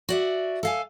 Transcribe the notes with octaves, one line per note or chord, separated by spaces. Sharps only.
F#4 D5 E5
A4 F5 G#5